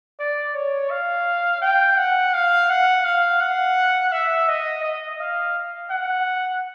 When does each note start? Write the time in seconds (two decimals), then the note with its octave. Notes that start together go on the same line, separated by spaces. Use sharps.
0.20 D5
0.54 C#5
0.90 F5
1.61 G5
1.97 F#5
2.34 F5
2.69 F#5
3.04 F5
3.40 F#5
4.12 E5
4.48 D#5
4.83 D#5
5.20 F5
5.90 F#5